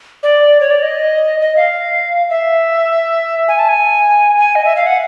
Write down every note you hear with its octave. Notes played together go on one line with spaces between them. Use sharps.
D5
C#5
D5
D#5
D#5
F5
E5
G#5
A5
G#5
G#5
D#5
E5
F5
F#5